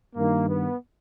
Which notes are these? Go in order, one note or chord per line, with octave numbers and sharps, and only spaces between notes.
G2 D#3 A#3
B3